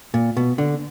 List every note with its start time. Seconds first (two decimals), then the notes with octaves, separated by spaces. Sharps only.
0.14 A#2
0.37 B2
0.58 D3